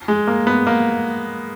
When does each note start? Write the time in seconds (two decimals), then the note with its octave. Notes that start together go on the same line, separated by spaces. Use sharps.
0.08 G#3
0.27 A#3
0.47 B3
0.67 A#3